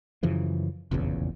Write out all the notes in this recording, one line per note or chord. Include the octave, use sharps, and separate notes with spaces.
F#2 C#3 E3 F3
F1 A#1 E2 C#3